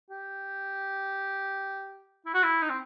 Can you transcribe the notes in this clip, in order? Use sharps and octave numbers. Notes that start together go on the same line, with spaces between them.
G4
E4
F#4
E4
D#4
C4